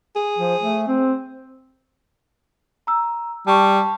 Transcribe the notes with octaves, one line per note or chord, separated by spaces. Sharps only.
G#4
F3
A3
C4
A#5 E6
G3 A5 C#6